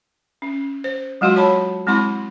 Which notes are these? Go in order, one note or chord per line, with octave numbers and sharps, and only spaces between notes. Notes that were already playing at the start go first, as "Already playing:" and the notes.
C#4
C5
F#3 G#3 F4 F#4 F5 C6
F4 C#5 A5 B5
G#3 C4 E4 B5 C6